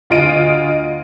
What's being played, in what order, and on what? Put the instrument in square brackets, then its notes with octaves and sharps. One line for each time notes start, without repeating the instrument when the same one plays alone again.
[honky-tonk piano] D2 F4 D#5 D7 D#7